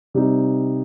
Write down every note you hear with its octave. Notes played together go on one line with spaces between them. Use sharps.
C3 G3 C4 D#4